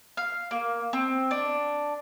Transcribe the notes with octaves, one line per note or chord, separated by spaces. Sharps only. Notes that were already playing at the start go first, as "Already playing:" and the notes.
F5
A#3
C4
D4